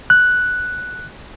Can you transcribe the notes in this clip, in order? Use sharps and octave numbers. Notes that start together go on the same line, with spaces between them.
F#6